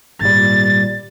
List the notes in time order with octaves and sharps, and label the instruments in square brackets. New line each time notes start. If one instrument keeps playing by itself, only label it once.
[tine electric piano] G#1 A#2 G3 [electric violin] A6